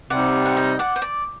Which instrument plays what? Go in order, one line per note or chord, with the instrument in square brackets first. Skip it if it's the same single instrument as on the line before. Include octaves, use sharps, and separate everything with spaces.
[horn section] C3 G3 C4 D#4 [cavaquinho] D5 F#5
[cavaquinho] F#5
D#5 G5
D5 F#5
C5
D5